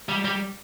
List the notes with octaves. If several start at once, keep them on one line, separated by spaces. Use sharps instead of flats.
G3
G3